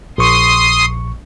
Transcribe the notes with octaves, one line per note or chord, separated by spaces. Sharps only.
A#1 C6 C#6 D#6